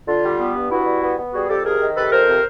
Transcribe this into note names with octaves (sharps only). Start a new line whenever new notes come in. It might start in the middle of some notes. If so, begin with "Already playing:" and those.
D3 F4
G3
B3
G2
B3 E4 F#4
G3
B3
B3
G3 F#4 G#4
F2 G4 A4
C3 G#4 A#4
D#3
C3 A4 B4
F2 A#4 C5
C3